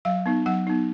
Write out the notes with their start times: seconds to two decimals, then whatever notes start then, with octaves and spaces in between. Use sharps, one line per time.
0.05 F#3 F5
0.26 B3 D#4
0.46 F#3 F#5
0.67 B3 D#4